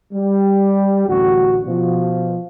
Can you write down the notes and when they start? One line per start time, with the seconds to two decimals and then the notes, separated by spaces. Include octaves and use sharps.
0.14 G3 G4
1.08 A1 D2 F#4
1.66 B2 F3